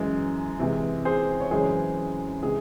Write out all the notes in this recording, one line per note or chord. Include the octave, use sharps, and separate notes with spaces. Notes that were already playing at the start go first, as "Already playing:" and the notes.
Already playing: F#2 E3 G#3
C3 E3 G#3
G#4 C5
C#5
F#2 C#3 E3 G#3 G#4 C5
C3 E3 G#3 G#4